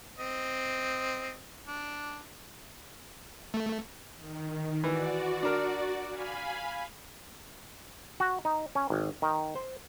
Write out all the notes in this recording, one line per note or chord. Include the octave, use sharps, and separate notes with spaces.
C4 D#5
D4
A3
D#3
E3 F#4 D5
D4 A#4
F5 G#5 B5
F#4
D#4
C#4
G#1
D#3
C5